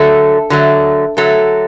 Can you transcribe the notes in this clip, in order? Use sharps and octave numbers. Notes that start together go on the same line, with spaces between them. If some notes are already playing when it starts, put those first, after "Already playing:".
Already playing: D3 F#3 A3 A4
D3 F#3 A3
D3 F#3 A3 A4